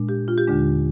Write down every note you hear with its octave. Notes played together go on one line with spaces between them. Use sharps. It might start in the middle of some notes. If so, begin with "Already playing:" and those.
Already playing: A#2 G#3 D4
G4
F4
G4
D#2 D3 G#3 D4